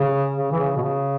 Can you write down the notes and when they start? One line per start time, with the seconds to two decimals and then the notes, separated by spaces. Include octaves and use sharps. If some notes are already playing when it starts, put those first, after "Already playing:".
Already playing: C#3
0.37 C#3
0.52 E3
0.59 C#3
0.76 B2
0.82 C#3